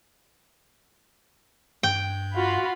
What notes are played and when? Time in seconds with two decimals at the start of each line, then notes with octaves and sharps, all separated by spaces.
1.83 G2 G5
2.36 F4 F#4 B5